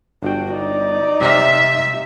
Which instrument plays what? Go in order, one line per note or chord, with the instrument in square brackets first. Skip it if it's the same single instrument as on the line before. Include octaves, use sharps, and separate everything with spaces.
[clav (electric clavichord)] G1 G5 [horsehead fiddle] D4 F#4
[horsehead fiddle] D#4 [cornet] D5
[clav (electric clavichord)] C3 F5 [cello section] E5